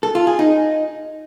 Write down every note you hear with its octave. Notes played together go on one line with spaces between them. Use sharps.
A4
F4
G#4
D#4